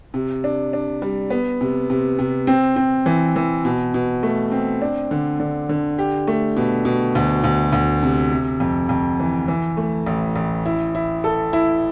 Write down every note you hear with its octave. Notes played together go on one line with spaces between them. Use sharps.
C3
D4
D4
G3
B3
C3
C3
C3
C4
C4
E3
E3
B2
B2
A3
C4
D4
D3
D3
D3
G4
A3
B2
B2
D2
D2
D2
C3
C3
F2
F2
E3
E3
A3
A1
A1
E4
E4
A4
E4